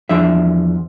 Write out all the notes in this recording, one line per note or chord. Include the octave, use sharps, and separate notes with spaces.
E2 F3 D4 E5